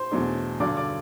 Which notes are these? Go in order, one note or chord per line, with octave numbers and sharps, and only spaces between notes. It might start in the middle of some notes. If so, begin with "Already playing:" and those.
Already playing: C5 C6
E2 B2 F#3 A3 D4
G2 D3 F#3 D5 D6
D5 D6